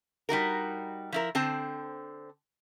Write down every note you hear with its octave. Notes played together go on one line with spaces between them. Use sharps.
G3 D#4 F#4 A#4
F3 E4 A#4
D3 C4 C5 A5